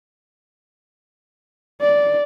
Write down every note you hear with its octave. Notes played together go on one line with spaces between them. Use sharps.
D5